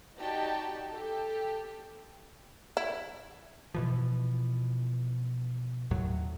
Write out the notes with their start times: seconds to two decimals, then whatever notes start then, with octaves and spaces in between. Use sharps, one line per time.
0.19 D#4 F#4 G4 D5 G5 A5
0.92 G4 A4
2.77 E4
3.74 B2 E3 F3
5.91 D#2 A2 F#3